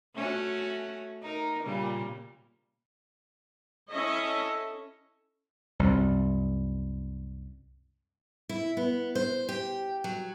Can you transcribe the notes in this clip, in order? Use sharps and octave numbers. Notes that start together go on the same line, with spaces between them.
A3 C#4 F#4
D#4 A#4
A#2 C#3 G3
C#4 E4 A4 C#5 D#5 E5
C2 F#2
E4
B3
C5
G4
F#3